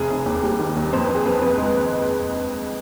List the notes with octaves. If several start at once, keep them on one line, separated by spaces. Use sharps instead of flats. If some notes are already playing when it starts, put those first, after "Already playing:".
Already playing: F1 G#4
F1
D#2
G3
D#3
D#2
F2 C5
F2 B4
G#4
F2 B4
F2 B4
G#3
B4